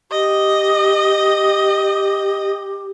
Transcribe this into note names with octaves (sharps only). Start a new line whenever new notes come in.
G4 D#5